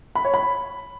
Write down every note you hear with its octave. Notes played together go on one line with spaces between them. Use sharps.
B5
C#5
B5